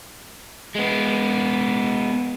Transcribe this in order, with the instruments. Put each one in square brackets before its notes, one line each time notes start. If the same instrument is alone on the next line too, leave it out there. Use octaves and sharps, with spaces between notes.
[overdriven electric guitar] G#3 B3